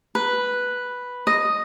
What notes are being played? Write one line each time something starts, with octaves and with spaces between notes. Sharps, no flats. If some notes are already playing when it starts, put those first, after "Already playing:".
B4
D#5